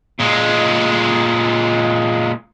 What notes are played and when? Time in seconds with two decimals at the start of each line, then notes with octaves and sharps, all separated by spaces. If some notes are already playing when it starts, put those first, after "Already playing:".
0.20 A#2 G#3